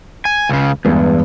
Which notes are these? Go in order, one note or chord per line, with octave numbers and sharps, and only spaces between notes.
G#5
C#2 C#3
E2 G2 G#3 B3